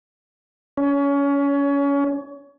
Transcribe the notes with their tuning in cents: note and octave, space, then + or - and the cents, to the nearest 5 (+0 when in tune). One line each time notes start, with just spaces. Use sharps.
C#4 +25